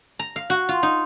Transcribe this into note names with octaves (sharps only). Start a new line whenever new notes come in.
A#5
F5
F#4
F4
D#4